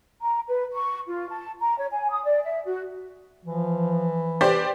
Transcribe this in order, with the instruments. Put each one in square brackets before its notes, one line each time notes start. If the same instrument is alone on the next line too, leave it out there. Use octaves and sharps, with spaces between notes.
[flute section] A#5
B4
C#6
F4
A5
A#5
C#5
G#5
D#6
D5
E5
F#4
[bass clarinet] E3 [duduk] F3
[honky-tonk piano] G4 C5 D5 [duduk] B4